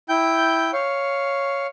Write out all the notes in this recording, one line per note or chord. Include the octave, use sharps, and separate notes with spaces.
E4 G5 G6
C#5 F5